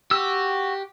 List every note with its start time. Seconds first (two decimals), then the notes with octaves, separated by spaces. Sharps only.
0.11 F#4 G4 E6